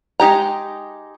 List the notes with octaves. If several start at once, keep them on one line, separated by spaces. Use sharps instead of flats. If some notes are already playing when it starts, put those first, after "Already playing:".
G#3 D#4 G4 A#5